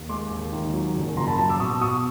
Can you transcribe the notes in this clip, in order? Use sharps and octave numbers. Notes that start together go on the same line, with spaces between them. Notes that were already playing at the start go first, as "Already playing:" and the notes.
Already playing: D#2
G#3 C6 D6
D#2
D#3
F#3
F#1
F#1 A#5 C6
A5 B5
F#3 A5 B5
D6 E6
B2 C#6 D#6
B2 C#6 D#6